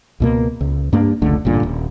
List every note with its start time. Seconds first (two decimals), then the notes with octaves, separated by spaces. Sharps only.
0.20 C#2 B2 A#3
0.61 C#2
0.93 G2 A#3 D4
1.22 F1 C#2 D3 A3
1.45 A1 G2 A#2 D3
1.63 D#1